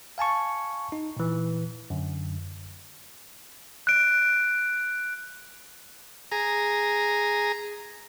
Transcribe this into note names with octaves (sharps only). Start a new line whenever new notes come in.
F5 G#5 A5 C#6
D#4
A#2 E3
F#2 D3
F#6 D7
G#4 A#5